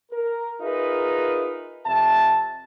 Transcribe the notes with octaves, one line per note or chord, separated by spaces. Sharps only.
A#4
D#4 F4 G#4 A#4 B4 E5
F2 C3 E5 A5